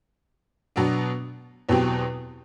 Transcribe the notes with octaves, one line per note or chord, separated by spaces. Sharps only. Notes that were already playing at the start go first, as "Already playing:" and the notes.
B2 F#3 B3 D4
E2 B2 F#3 C4 G4